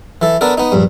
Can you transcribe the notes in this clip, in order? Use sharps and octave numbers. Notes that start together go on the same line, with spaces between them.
E3 A4
B3 D4 A4 A#4
B3 D#4
A#1 G2